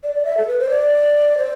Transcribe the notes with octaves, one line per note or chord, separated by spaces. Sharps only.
D5
D5
E5
A4
B4
C5
D5
C5